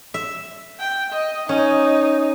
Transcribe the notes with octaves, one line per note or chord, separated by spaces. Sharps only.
E5
G5
D#5
C#4 D#4